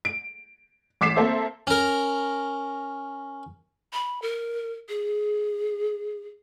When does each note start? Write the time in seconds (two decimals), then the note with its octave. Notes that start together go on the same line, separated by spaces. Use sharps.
0.05 D7
1.01 A1 D6 B6 C7 E7
1.16 A#3 C4 A4 C5 E5
1.67 C#4 A#4
3.93 B5
4.22 A#4
4.89 G#4